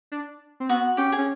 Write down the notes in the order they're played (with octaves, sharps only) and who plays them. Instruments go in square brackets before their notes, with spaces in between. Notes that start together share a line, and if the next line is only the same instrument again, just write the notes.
[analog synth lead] D4
C4
[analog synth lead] B3 [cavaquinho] F#4 F#5
[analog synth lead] C#4 [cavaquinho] G4 G5
[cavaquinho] G#4 G#5
[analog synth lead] C#4